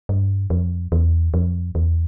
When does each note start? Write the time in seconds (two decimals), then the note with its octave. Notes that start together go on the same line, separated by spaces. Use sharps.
0.09 G2
0.50 F2
0.92 E2
1.34 F2
1.75 E2